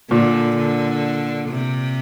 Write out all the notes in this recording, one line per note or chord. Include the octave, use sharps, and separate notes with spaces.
A#2 D3
D3
C3